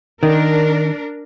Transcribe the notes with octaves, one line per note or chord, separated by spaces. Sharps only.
D#3 D4 A#4